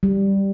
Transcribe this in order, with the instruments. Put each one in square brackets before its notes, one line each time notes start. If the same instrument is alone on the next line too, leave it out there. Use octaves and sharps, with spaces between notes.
[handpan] G3